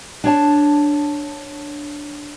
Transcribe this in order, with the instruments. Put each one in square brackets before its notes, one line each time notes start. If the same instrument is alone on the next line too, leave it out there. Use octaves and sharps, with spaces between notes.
[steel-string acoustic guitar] D4 C#5 A5